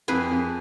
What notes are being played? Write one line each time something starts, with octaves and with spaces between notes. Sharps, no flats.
F2 G#4 B4
F2